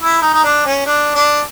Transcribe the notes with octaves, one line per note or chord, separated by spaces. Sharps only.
E4
D#4
D#4
D4
C#4
D4
D4